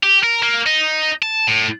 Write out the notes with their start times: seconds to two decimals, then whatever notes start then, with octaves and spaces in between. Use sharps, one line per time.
0.04 G4
0.24 A#4
0.43 A#3
0.66 D#4
1.23 A5
1.47 A2